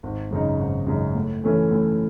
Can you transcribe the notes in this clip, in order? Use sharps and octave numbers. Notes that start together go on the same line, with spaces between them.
G#1
F#2 C#3 G#3 D#4
G#1
F#2 C#3 G#3 D#4
A2
E3 A3 C#4 E4
A2